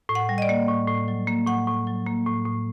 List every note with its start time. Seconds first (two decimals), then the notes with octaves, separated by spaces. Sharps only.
0.09 A2
0.15 F#5
0.29 G3
0.38 D#5
0.42 D5
0.49 A#3
0.69 A2
0.88 A2
1.08 F#3
1.27 A#3
1.47 A2 F#5
1.67 A2
1.87 F#3
2.06 A#3
2.26 A2
2.45 A2